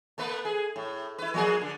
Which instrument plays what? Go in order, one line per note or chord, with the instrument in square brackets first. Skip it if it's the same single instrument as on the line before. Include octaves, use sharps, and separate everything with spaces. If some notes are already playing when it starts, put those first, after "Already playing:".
[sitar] A3 A#3 B4
G#4
A2
E4 B4
F3 A#3 G#4
D3